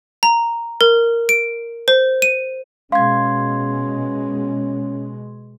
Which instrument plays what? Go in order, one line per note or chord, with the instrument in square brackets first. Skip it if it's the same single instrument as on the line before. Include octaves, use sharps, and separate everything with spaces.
[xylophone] A#5
A#4
D7
C5
D#7
[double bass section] B2 G#3 [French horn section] C#4 [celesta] F5 [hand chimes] C6 G#6